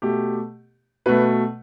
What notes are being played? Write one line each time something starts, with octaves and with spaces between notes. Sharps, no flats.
B2 A3 G4
B2 A3 B4